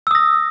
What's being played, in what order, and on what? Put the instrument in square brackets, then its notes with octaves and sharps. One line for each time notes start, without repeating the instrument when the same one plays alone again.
[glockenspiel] E6
D#6
A#6